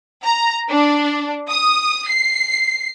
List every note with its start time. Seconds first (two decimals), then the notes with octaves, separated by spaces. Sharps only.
0.24 A#5
0.70 D4
1.50 D#6
2.08 C7